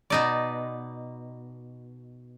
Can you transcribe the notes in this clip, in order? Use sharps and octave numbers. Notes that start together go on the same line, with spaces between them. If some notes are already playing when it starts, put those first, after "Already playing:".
B2 D#4 D5